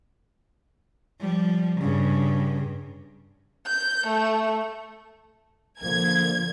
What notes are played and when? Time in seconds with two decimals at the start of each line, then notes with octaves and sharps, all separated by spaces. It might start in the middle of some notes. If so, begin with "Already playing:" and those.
1.20 F3 G3
1.78 G2 C#3
3.66 G6
4.07 A3
5.81 D3 F3 A#3 G#6